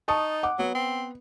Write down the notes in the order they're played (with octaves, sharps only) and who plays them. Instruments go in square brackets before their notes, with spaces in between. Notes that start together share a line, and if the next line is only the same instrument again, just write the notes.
[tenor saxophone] D#4 [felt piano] A5 C#6 D#6
[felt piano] F#5 D6
[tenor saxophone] F#3 [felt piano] B3
[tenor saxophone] C4